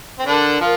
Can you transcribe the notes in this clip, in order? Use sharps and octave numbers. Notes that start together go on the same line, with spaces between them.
C4
D3 D4 A#4
F3 F4